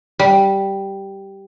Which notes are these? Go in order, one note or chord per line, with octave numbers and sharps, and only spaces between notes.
G3